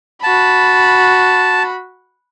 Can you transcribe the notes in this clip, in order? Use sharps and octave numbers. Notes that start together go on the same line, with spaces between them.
F#4 A5 B5